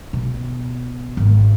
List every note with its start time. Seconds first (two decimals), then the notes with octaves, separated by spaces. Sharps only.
0.13 B2
1.17 G#1